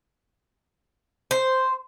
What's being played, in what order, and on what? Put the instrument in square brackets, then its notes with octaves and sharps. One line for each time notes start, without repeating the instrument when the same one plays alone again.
[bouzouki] C5